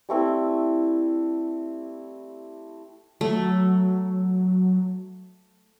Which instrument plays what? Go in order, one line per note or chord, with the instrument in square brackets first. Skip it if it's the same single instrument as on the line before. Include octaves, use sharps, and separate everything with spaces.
[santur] G3 A3 C4 E4
[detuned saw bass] F#3 [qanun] A3